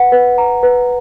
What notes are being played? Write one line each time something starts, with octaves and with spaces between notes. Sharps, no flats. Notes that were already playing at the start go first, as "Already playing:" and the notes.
Already playing: B4 F#5
B4
A#5
B4